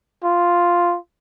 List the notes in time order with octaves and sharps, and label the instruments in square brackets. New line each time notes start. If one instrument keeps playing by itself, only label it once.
[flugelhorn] F4